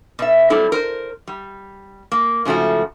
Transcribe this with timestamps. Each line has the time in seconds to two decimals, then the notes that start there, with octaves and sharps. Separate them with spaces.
0.19 B2 E5
0.50 F#3 G3 C4 E4 A4
0.72 A#4 C5
1.27 G3
2.12 A#3
2.45 G#2 C#3 F3 A3 F#4